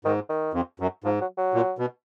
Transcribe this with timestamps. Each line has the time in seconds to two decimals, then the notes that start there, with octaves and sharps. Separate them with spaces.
0.05 G#2 D#3
0.29 D#3
0.54 F2
0.80 F#2
1.04 G#2 F3
1.21 F#3
1.37 F#3
1.54 A#2
1.78 B2